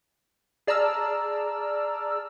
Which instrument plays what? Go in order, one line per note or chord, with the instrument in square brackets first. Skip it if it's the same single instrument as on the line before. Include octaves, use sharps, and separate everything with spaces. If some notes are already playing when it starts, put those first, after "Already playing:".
[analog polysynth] G#4 D5 A5 A#5 E6 F6